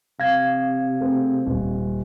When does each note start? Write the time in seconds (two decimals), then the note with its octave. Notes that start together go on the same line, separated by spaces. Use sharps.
0.20 C3 F5 G#6 A#6
1.01 A3 C4 G#4
1.46 D#1